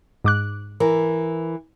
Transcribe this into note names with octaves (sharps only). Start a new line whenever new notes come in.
G#2 D6 F#6
E3 A#4